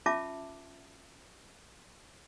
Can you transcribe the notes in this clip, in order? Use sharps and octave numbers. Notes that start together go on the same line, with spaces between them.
C#4 F4 E5 A5 D6